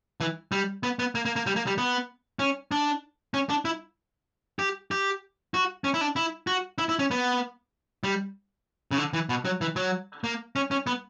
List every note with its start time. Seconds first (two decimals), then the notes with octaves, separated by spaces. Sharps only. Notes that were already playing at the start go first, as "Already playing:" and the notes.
0.21 E3
0.52 G3
0.83 B3
0.99 B3
1.15 A#3
1.25 A#3
1.36 A#3
1.46 G3
1.56 A#3
1.67 G3
1.78 B3
2.39 C#4
2.72 D4
3.34 C#4
3.50 D4
3.65 E4
4.59 G4
4.91 G4
5.54 F#4
5.84 C#4
5.94 E4
6.01 D4
6.16 E4
6.47 F#4
6.78 E4
6.89 E4
6.99 C#4
7.11 B3
8.04 G3
8.91 C#3
8.98 D3
9.13 E3
9.29 B2
9.45 F#3
9.61 E3
9.76 F#3
10.24 A#3
10.56 C#4
10.71 C#4
10.87 B3